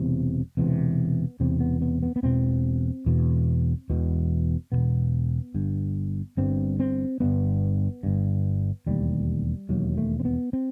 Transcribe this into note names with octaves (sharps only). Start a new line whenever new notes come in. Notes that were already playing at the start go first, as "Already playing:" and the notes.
Already playing: E1 E2 C3
E1 E2 C3 B3
E1 E2 C3 C4
B3
B3
B3
B3
E1 E2 B2 C4
E1 E2 B2
E1 E2 B2
E1 E2 B2 B3
G1 G2
G1 G2 C4
C4
G1 G2 B3
G1 G2
E1 D#2 G3
E1 D#2 F#3
A3
C4
B3
C4